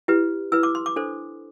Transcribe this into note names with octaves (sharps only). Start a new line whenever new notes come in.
E4 G4 B4
E4 B4 E6
D6
C6
D6
D4 A4 C5